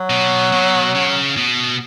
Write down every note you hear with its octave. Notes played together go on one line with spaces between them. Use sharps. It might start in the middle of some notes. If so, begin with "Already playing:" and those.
Already playing: F#3
B2
B2
C#3
B2